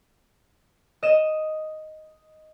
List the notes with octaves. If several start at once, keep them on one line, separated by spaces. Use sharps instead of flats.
D#5 E7